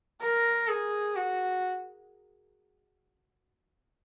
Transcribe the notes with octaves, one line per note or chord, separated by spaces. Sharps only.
A#4
G#4
F#4